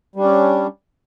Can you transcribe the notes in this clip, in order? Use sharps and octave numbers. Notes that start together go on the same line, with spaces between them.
G3 C#4 D4